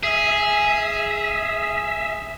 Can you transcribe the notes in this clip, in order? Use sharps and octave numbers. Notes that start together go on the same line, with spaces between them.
G#4 E5